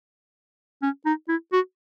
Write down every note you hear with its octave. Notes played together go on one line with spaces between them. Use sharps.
C#4
D#4
E4
F#4